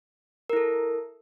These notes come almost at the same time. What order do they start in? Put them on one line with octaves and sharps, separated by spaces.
A#4 E4 A4